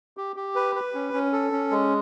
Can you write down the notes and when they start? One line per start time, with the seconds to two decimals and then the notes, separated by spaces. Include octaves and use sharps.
0.17 G4
0.36 G4
0.55 B4
0.76 B4
0.95 C#4
1.13 C#4
1.33 A4
1.52 C#4
1.71 G#3